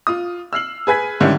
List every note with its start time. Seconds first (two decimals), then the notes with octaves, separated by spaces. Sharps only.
0.07 F4 D#6
0.53 E6 F6 C7 F#7
0.87 G#4 B4 G#5 G#6 B6
1.20 G#2 D3 D#3 G3 C#4 E4